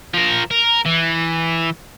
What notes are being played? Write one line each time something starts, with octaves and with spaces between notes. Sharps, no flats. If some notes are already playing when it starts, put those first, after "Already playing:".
F3 A#4
A#4
E3